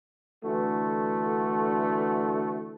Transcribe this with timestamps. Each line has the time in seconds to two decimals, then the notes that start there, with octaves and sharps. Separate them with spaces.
0.44 D3 E3 A3 F#4